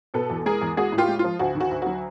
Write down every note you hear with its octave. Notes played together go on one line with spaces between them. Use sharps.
B2 A4 B4
E2
G#3 G#4 A#4
E2
G#3 F#4 G#4
A2
F4 G4
G#3
F3 F4
D2 F#4
D#3
F#4
D2
F#3 F#4